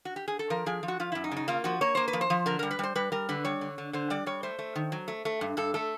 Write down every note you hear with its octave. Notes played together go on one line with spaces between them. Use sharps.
F#4
G4
G#4
A4
F3 A#4
F3 G#4
F3
F#4
F3 F4
F#2 E4
D#4
C#3
D#4
A#3 F4
F3 F#4
A#3 C#5
A#3 C5
B4
F3
C5
F3
D3 A#4
G3 A#4
B4
G3 C5
G3 B4
G3 A#4
D3 B4
G3 C#5
D3
D3
D3 C5
G3 D5
G3 C#5
A3 C5
A3
D#3
F#3
A3
A3
G2
G2 A4
A3 A4